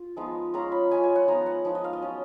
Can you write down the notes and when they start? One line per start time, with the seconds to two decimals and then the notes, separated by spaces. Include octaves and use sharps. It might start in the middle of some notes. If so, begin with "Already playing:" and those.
Already playing: F4
0.17 F3 G#3 B3 D#4
0.54 G#3 C#4 F4 A#5
0.72 B5
0.91 G#3 C#4 F4 G#5
1.03 G#5
1.16 F#5
1.28 F3 B3 D#4 A#5
1.46 F#5
1.65 F3 B3 D#4
1.75 D#5
1.84 F5
1.93 D#5
2.02 F#3 C#4 F4